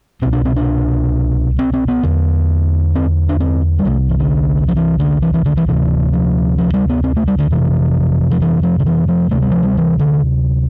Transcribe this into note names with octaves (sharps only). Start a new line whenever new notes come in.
C2 B2 C4
D4
C4
D4
C4
C4
B3
E2 D3
C4
D4
C4
G3
C2 C3 A3
E3
D3
F3
E3
D3
E3
E3
D3
E3
D2 C3 E3
F3
F3
G3
B3
C4
A3
G3
D3
F2 C3 E3
F3
E3
F3
D3
E3
F3
D2 C3 A3
G3
F3
G3
E3
D3